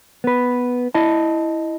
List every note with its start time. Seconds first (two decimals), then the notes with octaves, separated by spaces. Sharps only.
0.24 B3 B4
0.94 E4 D#5 A5